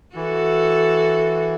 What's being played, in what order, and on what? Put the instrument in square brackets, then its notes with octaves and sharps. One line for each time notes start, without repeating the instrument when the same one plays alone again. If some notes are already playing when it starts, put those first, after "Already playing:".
[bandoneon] E3 [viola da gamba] F#4 A4